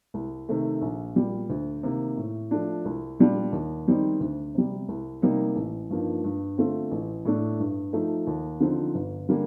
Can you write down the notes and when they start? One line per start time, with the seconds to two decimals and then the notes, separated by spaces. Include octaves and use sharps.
0.14 C2
0.49 C3 D#3 A3
0.82 A#1
1.16 A#2 G3
1.50 D2
1.83 C3 D#3 A#3
2.17 A2
2.51 F3 A3 D4
2.85 C2
3.19 A#2 G3 D4 F4
3.52 D#2
3.87 D#3 G3 C4 D#4
4.20 D2
4.55 C3 G3
4.88 C2
5.22 C3 G3 A#3 D#4
5.56 A1
5.90 G2 F3 A#3 D#4
6.24 G2
6.58 D3 A3 C4 F4
6.91 A1
7.25 A2 A3 D4
7.60 G2
7.93 F3 A3 D#4
8.27 D#2
8.60 D3 F3 C4 D#4
8.95 G1
9.29 D3 G3 A#3